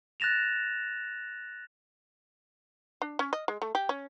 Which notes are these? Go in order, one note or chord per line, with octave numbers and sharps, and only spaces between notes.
F#6 A6 A#6 E7 F7
D4
C#4
D#5
G#3
A3
G4
C#4